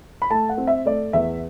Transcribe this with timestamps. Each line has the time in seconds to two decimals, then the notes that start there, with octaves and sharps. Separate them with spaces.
0.22 B5
0.30 A3 A5
0.49 F#5
0.58 C4
0.67 E5
0.86 A3 D5
1.13 E2 E5